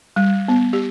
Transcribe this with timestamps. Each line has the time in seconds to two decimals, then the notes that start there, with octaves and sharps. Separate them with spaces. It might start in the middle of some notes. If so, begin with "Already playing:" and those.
0.16 G3
0.48 B3
0.73 G4